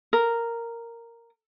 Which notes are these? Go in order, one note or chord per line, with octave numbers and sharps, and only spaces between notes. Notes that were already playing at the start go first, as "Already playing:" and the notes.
A#4